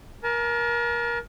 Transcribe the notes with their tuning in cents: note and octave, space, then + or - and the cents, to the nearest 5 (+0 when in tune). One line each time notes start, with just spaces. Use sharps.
A#4 +25 A5 -35